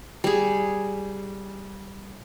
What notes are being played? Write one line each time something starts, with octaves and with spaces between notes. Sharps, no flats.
G3 G#4